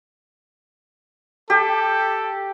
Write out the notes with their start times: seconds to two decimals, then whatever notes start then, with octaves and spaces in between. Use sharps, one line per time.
1.50 G4 A4